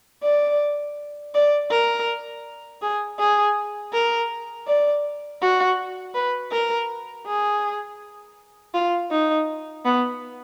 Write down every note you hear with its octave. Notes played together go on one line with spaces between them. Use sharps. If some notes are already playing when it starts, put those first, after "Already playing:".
D5
D5
A#4
G#4
G#4
A#4
D5
F#4
B4
A#4
G#4
F4
D#4
B3